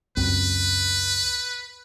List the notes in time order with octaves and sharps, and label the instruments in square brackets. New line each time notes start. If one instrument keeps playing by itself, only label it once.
[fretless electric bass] C#2 F#2 C4 [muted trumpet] B4